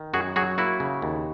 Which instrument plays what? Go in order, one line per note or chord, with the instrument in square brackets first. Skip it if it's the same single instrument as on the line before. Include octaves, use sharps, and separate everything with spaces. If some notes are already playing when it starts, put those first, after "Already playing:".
Already playing: [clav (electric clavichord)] D#3
F#2 F#4 G#4
F#3 F#4 G#4
A#3 E4 F#4
C#3
D#2